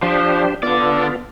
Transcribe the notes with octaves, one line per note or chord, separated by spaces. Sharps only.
F3 D4 G4 C5
D3 B3 F4 D5